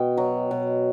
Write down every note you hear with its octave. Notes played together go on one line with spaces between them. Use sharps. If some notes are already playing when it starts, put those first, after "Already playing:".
Already playing: B2 G5
F#3
B2